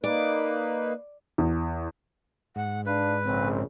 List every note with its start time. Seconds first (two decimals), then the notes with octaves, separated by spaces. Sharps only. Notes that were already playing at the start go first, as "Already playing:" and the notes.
0.04 A#3 D#4 B4 D5
1.38 E2
2.56 G#2 F#5
2.86 D4 B4 F5
3.24 A#1 C#3 C4